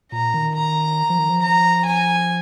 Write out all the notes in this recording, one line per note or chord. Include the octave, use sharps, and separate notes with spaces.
A#2 A#5
D#3
A#5
F3
D#3
F3
A#5
G#5